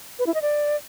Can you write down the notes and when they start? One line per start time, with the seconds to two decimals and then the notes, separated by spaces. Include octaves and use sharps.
0.19 B4
0.27 E4
0.34 D#5
0.42 D5